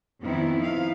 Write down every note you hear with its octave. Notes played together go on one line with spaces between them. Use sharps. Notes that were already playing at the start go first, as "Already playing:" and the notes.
F2 D#3 B3 C4 D4 E4
F3 D#4 E4 F5